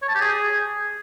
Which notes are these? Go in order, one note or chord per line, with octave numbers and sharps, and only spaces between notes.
C#5
A5
G4
G#4